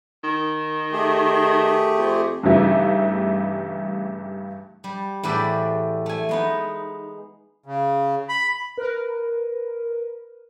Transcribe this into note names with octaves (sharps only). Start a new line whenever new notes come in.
D#3
A3 G4 G#4
F2
G2 C#3 E3 G3 A3 D#4
G3
E2 A2 G4 B4 C5 D5
A3 G#5
G#3 B3 D#4
C#3
B5
A#4 B4